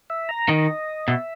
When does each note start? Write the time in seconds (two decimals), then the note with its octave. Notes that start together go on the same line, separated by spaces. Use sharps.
0.10 E5
0.29 A#5
0.48 D#3 D#5
1.08 B2 E5